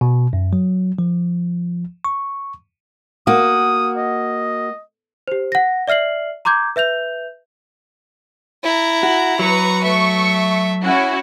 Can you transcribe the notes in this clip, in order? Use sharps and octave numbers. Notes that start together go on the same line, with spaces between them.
B2
F#2
F#3
F3
C#6
A#3 F#4 D#6
D#5
G4 C5
F#5 A#6
D5 E5 F6 C7 F#7
A#5 C6 D6 G6 G#6
B4 E5 G6 F7
E4 A#5
F#4
F#3 B4 A#5 C#6
A3 E5 C#6
C#4 E4 F#4